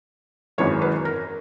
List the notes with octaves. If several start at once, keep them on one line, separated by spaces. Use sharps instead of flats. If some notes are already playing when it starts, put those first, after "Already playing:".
G#1 F#2 E3 G#3 C#5
B4
A#4